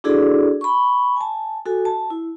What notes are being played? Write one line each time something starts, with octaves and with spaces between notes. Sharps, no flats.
D4 E4 F#4 G#4 A4 D5
B5 C#6
G#5 A5
F#4 A4 G#5
A5
E4